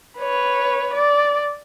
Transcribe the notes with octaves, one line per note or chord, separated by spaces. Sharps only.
B4 C#5
D5